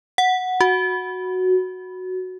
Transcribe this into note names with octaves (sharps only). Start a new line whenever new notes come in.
F#5
F#4